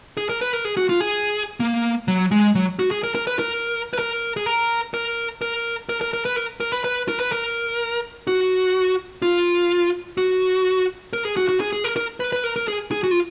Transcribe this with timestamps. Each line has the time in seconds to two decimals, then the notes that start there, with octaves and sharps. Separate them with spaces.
0.17 G#4
0.29 A#4
0.41 B4
0.53 A#4
0.65 G#4
0.77 F#4
0.89 F4
1.01 G#4
1.60 A#3
2.08 F#3
2.31 G#3
2.55 F#3
2.79 F#4
2.91 G#4
3.03 A#4
3.15 A#4
3.27 B4
3.39 A#4
3.93 B4
3.99 A#4
4.37 G#4
4.46 A#4
4.94 A#4
5.42 A#4
5.89 A#4
6.01 A#4
6.13 A#4
6.25 B4
6.36 A#4
6.60 A#4
6.72 B4
6.84 B4
7.08 A#4
7.20 B4
7.32 A#4
8.27 F#4
9.22 F4
10.18 F#4
11.13 A#4
11.25 G#4
11.37 F#4
11.49 F#4
11.60 G#4
11.73 G#4
11.84 A#4
11.96 A#4
12.20 B4
12.32 B4
12.44 A#4
12.56 A#4
12.68 G#4
12.91 G#4
13.04 F#4
13.11 F4